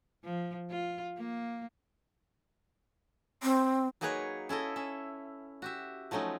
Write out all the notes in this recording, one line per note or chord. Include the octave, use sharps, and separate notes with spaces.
F3
F4
A#3
C4
F#3 A#3 D#4 G#4 B4 C#5
C#4 E4 A4 D#5
C#4 E5
F#4 G4 E5
F3 F#3 A3 C#4 D#4